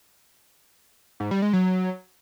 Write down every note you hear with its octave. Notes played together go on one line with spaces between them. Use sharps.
G#2
G3
G#3
F#3